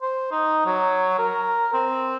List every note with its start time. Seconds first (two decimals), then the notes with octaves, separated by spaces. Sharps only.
0.02 C5
0.32 D#4
0.66 F#3
1.19 A#4
1.74 C4